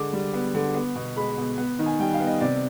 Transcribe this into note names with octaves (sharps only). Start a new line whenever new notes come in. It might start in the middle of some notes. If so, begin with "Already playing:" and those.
Already playing: D3 G#3 D6
G3
B3
D3
B3
B2
G#3 B5
B2
B3
D#3
G#5
G3 G5
F5
B3
D#5
C3 D5